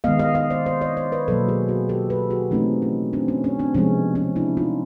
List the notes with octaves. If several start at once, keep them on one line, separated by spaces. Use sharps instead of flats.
D#3 G#3 B3 D#5 F5
D#5 F5
D#5 F5
C5 D5
C5 D5
C#5 D#5
C5 D5
B4 C#5
B2 F#3 A#3 A4 B4
F#4 G#4
F#4 G#4
G4 A4
A4 B4
F#4 G#4
E3 A3 C4 C#4 D#4
C#4
C4 D4
C#4
C#4
C4 D4
C3 F3 G#3 B3 C#4
C#4
D4 E4
D#4 F4